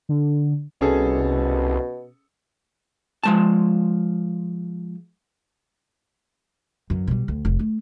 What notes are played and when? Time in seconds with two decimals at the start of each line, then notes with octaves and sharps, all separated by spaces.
0.09 D3
0.81 C2 B2 C#4 G#4 A4
3.24 F3 G#3 A5
6.90 F#2 E3
7.07 B2 G3
7.28 D2
7.45 F1
7.59 A3